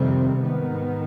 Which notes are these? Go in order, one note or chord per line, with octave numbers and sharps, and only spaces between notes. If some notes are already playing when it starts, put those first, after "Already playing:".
Already playing: F2 C3 D#3 G3 C4
G#2 D#3 B3